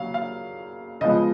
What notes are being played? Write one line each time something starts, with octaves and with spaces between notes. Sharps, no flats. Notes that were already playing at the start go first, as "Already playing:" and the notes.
Already playing: C#3 F#3 A#3 F5
F5
C#3 F3 G#3 B3 D#5